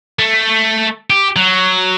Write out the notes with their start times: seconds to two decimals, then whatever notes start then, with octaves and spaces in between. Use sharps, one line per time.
0.19 A3
1.10 G4
1.36 F#3